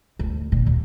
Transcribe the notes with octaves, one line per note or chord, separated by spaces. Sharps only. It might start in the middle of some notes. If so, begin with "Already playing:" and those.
D2
A#2 D3
D#2